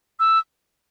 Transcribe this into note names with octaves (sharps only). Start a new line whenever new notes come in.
E6